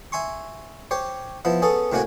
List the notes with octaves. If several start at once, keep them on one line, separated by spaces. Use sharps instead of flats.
E5 G#5 C6 C#6
G4 C5 C#5
F3 B3 E4
B3 C#4 G#4 A4
A2 C3 A#3 C#4 F#4 G#5